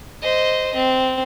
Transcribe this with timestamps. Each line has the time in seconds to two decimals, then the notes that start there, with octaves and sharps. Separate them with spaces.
0.22 C5 D#5
0.75 C4